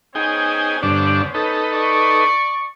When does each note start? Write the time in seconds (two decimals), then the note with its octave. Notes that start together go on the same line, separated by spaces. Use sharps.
0.15 B3 C#4 D#4 G#4 C5 G5
0.82 G2 D3 D4
1.34 D#4 A4 B4
1.72 D5 C#6